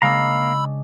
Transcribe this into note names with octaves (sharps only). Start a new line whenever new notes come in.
C#3 G#3 A#3 D4 F5 A#5 B5 E6